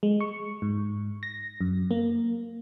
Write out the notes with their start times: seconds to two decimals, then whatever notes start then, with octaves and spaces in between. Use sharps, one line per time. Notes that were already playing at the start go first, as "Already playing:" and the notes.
0.03 G#3
0.21 C#6
0.62 G#2
1.23 A#6
1.61 F#2
1.91 A#3